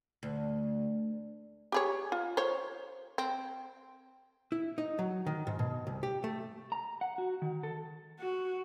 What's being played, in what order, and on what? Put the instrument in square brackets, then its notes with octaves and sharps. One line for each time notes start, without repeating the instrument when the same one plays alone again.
[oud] D2
[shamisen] G4 G#4 C#5
F4
C5 C#5
C4
[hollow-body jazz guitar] E4
D#4
F#3
D#3
G#2
B2
C2
G4
A3
[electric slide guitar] A#5
F#5
F#4
D#3
A4
[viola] F#4